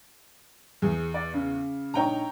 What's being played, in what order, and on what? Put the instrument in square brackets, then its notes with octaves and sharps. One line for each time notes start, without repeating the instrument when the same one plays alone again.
[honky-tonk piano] E2 [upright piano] G#4
[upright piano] D5
C#3
[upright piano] A#1 D#4 [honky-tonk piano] C#5 G5 A#5